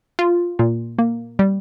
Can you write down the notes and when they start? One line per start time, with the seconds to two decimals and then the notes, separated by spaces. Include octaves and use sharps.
0.19 F4
0.59 A#2
0.99 A#3
1.39 G3